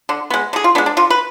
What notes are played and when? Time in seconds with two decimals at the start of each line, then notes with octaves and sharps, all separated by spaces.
0.09 D3
0.30 G#3 B3
0.53 D3 G#4
0.64 F4
0.75 G#3 B3 D4
0.86 D4
0.97 D3 F4
1.10 B4